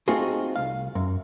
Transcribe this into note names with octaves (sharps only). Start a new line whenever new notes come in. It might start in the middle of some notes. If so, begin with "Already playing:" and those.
A3 C4 D#4 F4 F#4 G#4
C2 F5
F#2